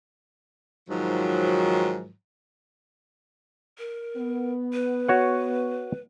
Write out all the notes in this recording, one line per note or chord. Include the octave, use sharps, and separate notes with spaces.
G#2 D#3 F3 F#3
A#4
B3
B4
F#4 C#5 F#5